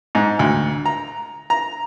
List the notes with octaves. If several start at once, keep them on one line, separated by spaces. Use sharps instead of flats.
G#2
D2
A#5
A#5